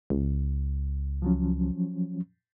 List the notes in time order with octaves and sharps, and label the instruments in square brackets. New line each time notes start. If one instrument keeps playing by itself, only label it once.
[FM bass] C#2
[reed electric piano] F3 F#3 C#4